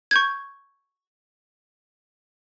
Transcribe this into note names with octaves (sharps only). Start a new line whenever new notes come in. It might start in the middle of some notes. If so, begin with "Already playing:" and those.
C#6 G6 G#6